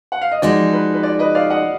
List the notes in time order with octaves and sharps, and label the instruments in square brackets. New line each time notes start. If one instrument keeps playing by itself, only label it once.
[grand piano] F#5
F5
D#5
[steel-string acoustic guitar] F3 G#3 D#4 F#4 [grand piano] D5
[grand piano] B4
B4
D5
B4 D#5
D5 F5
D#5 F#5